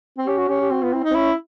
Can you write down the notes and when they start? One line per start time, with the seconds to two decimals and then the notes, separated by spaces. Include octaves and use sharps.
0.18 C4
0.27 C#4 G4
0.38 F#4
0.48 C#4 G4
0.60 G4
0.70 C4 F#4
0.82 B3 F4
0.93 C4 E4
1.04 D#4
1.11 C4
1.15 C#4 E4